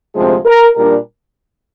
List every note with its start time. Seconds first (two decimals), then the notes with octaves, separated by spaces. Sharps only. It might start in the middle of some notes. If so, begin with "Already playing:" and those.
0.15 D2 C3 F3 G#3 C4 G#4
0.45 A#4
0.75 A#2 G3 D4 A#4